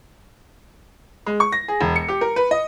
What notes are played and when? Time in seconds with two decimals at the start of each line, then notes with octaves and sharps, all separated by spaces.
1.26 G#3
1.40 C#6
1.52 A#6
1.68 G#4
1.81 E1
1.96 C#7
2.08 G4
2.21 A#4
2.36 B4
2.51 D#5